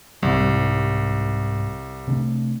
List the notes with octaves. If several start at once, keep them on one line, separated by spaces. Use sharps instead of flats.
C2 G#2 G3
C3 A3 D4